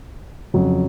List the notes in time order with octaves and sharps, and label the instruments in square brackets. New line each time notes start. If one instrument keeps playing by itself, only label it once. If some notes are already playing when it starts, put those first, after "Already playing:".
[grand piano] F2 C#3 F#3